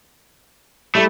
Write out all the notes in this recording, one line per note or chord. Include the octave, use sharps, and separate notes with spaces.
G3 A3 E4 A4